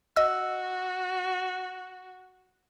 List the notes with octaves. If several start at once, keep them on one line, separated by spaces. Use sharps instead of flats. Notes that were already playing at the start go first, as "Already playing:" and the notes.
F#4 D#5 E6